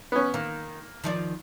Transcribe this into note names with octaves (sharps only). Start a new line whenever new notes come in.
B3 C#4
D#3 A#3
D#3 F3 D5